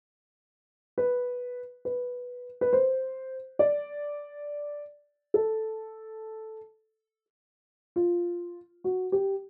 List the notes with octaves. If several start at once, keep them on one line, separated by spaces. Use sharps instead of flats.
B4
B4
B4
C5
D5
A4
F4
F#4
G4